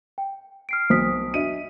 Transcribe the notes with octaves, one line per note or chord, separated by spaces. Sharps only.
G5
F6 C7 D7
B1 C5 D#6 B6
D4 F#4 D#5 E5 D#7